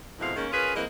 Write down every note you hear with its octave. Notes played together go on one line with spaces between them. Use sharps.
F2 G#2 B2 E4 F5
D#3 G#3 A#3 C#4
C#4 F4 G#4 A#4 B4
E3 G#3 A#3 C4 D#5